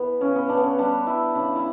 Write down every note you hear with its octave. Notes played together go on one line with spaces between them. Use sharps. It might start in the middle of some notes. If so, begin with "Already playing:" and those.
Already playing: E3 B3
C#3 C#4
B3
C#3 D4
B3
C#4
G3 D4
G3 E4
C#3 D4
E4